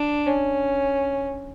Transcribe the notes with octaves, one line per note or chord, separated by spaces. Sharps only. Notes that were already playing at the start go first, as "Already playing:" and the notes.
Already playing: D4
C#4